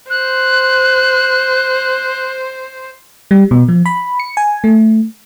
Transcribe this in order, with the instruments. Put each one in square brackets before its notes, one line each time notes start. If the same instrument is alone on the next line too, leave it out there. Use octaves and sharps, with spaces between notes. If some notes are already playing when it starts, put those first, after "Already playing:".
[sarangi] C5 [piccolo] F#6
[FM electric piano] G3
B2
F3
B5
C#7
G#5
A3